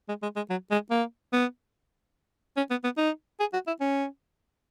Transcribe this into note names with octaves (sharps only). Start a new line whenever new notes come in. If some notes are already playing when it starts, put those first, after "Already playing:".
G#3
G#3
G#3
F#3
G#3
A#3
B3
C#4
B3
B3
D#4
G#4
F#4
E4
C#4